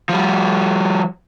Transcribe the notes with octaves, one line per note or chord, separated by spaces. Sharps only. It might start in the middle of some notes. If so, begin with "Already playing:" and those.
F3 G3